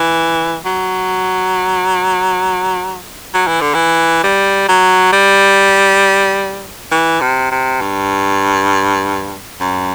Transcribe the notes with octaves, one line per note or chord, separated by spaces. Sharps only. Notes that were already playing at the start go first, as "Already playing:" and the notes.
Already playing: E3
F#3
F#3
E3
D3
E3
G3
F#3
G3
E3
C3
C3
G2
F#2